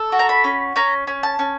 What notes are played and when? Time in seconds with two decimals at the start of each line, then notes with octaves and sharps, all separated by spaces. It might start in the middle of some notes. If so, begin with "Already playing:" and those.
Already playing: A4
0.12 F#4
0.19 A#5
0.29 B5
0.44 C#4
0.76 C#4 A#5
1.07 C#4
1.23 A5
1.39 C#4